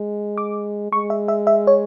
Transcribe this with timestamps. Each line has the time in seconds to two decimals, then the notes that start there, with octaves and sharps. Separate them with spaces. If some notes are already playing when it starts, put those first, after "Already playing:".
Already playing: G#3
0.38 D6
0.92 G#3 C#6
1.10 E5
1.28 E5
1.47 E5
1.67 C#5